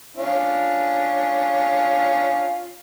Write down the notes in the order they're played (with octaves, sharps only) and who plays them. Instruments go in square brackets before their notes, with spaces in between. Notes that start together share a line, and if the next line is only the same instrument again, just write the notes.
[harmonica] C#4 D4 F4